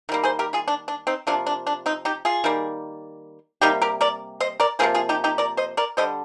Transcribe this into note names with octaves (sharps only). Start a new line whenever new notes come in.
D#3 G3 A#3
G#4 C5
G4 A#4
F4 G#4
D4
D4
C4 D#4
C3 F3 A#3 D4
D4
D4
C4 D#4
D#4 G4
F4 G#4
D#3 G3 A#3
C3 G3 A#3 D#4 G4
G4 A#4
A#4 D5
C5 D#5
A#4 D5
C3 F3 A#3 G#4 C5
F4 G#4
D#4 G4
D#4 G4
A#4 D5
C5 D#5
A#4 D5
D3 G3 C5 D#5